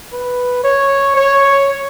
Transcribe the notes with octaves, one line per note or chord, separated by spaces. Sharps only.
B4
C#5
C#5